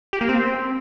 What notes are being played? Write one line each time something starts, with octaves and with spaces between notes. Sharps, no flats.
G4
A#3
C4